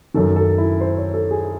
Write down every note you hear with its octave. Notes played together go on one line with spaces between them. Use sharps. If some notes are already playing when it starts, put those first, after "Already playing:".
F#2 D#3 A4
A4
E4
C5
C#5
A4
G#4